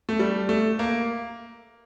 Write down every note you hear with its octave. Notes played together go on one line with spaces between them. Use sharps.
A3
G3
A3
A#3